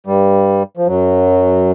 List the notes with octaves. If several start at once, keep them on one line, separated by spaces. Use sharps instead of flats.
G2 G3
F3
F#2 F#3